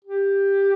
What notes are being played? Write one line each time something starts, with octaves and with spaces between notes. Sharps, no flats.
G4